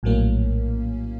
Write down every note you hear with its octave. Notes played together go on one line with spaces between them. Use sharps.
A#1 A2 F#3 A#3 C#4